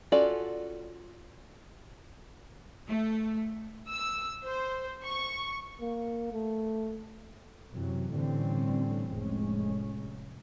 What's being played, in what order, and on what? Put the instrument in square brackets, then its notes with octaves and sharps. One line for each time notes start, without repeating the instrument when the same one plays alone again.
[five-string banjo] C#4 F4 F#4 A4 D5
[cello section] A3
[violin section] E6
C5
C#6
[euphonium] A#3
A3
[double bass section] F#2 C3 E3 F#3
A2 D3 E3 G3 C4 C#4
F1 A2 G#3 C#4